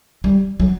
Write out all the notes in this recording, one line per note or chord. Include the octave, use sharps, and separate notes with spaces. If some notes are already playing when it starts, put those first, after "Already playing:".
G3
F#3